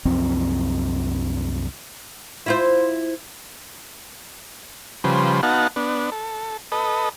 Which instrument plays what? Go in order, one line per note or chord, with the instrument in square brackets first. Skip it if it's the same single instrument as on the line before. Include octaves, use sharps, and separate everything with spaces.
[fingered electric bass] C2 F#2 F3 C4
[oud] E4 F4 C5
[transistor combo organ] C#3 F3 G3 B4 C5
B3 D#4 F#4 F5 F#5 A5
B3 D4
A4
A4 B4 D#5